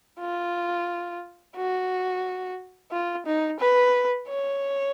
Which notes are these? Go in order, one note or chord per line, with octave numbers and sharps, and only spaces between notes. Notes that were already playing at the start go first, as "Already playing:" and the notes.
F4
F#4
F4
D#4
B4
C#5